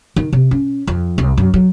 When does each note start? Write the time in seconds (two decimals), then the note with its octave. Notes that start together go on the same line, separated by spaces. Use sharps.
0.16 D#3
0.33 C3
0.51 C#4
0.87 F2
1.18 C2
1.38 F#2
1.54 F#3